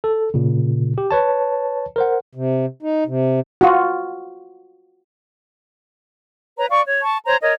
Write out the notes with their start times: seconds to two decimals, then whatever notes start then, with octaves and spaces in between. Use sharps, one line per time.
0.04 A4
0.34 A#2 C#3
0.98 G4
1.11 B4 C#5 A5
1.96 A#4 C5 F#5
2.35 C3
2.83 D#4
3.07 C3
3.61 F4 F#4
6.58 B4 C#5 A#5
6.71 D5 F5 C#6
6.86 C#5
7.02 A5 C#6
7.25 C5 C#5 A#5
7.41 A#4 C#5 D#5